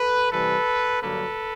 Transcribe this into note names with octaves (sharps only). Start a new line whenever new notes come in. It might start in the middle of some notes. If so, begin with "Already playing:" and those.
Already playing: A4 B4
C3 E3 G3 A4 B4
G2 D3 F#3 A#3 A4 B4